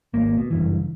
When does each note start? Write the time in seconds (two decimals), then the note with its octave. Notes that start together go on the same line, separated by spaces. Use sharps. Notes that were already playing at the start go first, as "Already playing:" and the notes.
0.14 G#1 A#3
0.37 B2
0.51 F#1 G2 E3